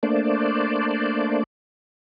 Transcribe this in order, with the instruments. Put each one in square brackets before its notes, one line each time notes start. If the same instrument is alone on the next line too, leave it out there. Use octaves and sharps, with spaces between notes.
[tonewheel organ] A3 A#3 D4 C5 D5